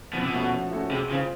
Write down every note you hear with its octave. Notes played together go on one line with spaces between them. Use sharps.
B2 F3
C3
B2
A3 C#4 F#4 A4
F3
A3 C#4 F#4 A4
C3 G#3
C#3 C4 F4